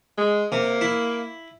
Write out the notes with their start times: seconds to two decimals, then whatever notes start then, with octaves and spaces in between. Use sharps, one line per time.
0.18 G#3
0.52 C3 A#3
0.81 E4